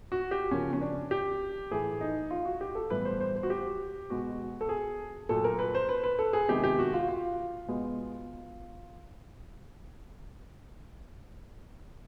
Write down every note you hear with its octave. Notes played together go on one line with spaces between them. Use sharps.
F#4
G4
C#3 F3 A#3 C#4
C#4
D4
G4
A2 E3 A3 G#4
D#4
F4
F#4
G4
A4
A2 E3 G3 B3 B4
C5
C5
C5
F#4
G4
B2 G#3 B3 F#4
A4
G#4
A#2 F#3 A3 A4
A#4
B4
C5
B4
B4
A4
G#4
C3 D#3 G#3 B3 G4
G4
F#4
F4
F4
B2 G#3 B3